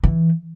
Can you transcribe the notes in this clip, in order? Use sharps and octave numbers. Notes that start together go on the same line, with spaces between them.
E3